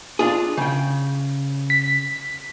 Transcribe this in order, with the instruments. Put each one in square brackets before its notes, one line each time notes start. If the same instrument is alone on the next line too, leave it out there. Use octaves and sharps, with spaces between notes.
[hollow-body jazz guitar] D4 F4 G#4
C#3 G5
[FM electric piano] B6